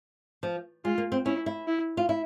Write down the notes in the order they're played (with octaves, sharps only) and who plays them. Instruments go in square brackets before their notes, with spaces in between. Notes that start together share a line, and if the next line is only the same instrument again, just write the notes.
[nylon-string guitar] F3
[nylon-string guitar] G#3 [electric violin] F4
[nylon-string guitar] A#3
C4
[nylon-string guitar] C#4 [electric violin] E4
[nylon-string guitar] E4
[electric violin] E4
[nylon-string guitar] F4
E4